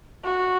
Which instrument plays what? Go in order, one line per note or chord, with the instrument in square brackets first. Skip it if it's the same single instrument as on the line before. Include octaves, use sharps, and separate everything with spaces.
[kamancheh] F#4